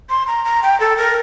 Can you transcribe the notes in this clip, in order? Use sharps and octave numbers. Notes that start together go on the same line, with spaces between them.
C6
A#5
A#5
G5
A4
A#4